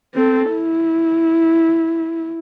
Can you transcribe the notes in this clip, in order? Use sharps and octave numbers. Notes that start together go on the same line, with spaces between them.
C4 A4
E4